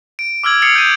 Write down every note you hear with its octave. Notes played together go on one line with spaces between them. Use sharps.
D7
D6 E6 F6 G#6 F#7
D#6 F6 A6 C7 C#7 F7
G6 C#7 D#7